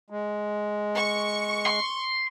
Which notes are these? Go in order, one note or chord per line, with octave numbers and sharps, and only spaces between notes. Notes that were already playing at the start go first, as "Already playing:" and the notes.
G#3
C#6
C6